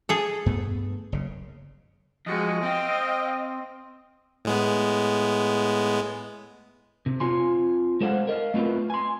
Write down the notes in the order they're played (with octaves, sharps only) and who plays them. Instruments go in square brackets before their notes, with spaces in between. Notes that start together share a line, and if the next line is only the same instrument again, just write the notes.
[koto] G#4 A4
[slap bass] G2 A3 B3
F#1 C#3
[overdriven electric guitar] F2 [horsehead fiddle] G#3 F#4 [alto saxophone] D#5
[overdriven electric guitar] C4 [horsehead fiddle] F5 G5
[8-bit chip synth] A2 G#3 B3
[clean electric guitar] C3
C4 F4 G#5 C6
G#3 A4 C5 F5 F#5
A#4 D#5 F5
A3 B3 C4 E4 F4 B4
G#5 C6